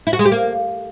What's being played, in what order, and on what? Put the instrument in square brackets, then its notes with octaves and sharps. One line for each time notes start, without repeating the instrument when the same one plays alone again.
[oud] E4
F#4
G#3
G4
A#3